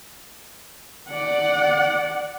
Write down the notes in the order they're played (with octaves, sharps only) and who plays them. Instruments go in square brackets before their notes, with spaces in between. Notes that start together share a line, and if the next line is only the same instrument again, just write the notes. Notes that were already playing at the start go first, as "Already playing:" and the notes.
[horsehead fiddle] D5 F#5